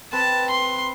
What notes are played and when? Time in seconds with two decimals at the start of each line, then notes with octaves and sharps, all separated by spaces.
0.12 C4 B4 A5
0.50 C6